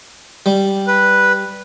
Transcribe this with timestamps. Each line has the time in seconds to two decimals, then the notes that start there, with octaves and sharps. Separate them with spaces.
0.46 G3
0.87 B4